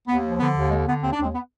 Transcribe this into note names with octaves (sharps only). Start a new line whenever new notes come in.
D#2 B3
F3
D3 B3
D#2
D3 G#3
D3 B3
D#2 C4
D4
D#2 G#3 C4
B3